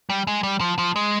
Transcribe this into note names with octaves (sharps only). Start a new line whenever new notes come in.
G3
G#3
G3
F3
F3
G#3